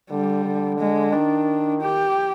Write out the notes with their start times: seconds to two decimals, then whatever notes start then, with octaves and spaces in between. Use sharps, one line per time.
0.10 D3 G3
0.45 D3
0.79 G#3
1.13 D#3 D4
1.81 G4